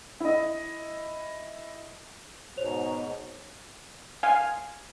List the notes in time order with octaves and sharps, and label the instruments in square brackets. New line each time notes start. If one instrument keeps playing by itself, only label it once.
[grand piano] E4 D#5
[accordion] G#2 B2 [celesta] C5 C#5 F7
[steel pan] F5 G#5